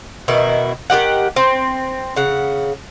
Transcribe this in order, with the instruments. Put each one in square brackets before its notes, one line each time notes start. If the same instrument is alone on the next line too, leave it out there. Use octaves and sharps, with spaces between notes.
[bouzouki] B2 D#3 E4
D#3 G#3 G4 F#5
C4
C#3 F#5